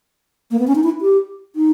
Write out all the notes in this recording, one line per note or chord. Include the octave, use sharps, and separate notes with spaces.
A#3
B3
C#4
D#4
E4
G4
D#4